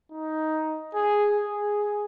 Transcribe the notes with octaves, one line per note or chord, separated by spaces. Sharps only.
D#4
G#4
G#4